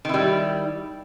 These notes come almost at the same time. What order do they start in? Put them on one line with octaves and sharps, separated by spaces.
D#3 E4 G3